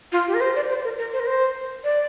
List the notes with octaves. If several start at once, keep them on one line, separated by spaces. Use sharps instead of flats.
F4
G4
A#4
C5
D5
C5
A#4
A#4
C5
A#4
C5
D5